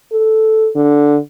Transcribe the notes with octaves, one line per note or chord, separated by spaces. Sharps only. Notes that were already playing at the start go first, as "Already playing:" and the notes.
A4
D3